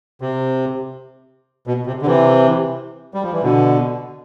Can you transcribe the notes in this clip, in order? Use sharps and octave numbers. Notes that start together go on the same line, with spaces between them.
C3
B2
C3
D3
C3 E3
G3
F3
E3
B2 D3